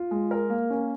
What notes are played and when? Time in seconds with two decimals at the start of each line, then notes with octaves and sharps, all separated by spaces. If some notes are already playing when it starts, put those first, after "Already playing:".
Already playing: F4
0.11 G#3
0.31 A#4
0.50 A#3
0.70 C#4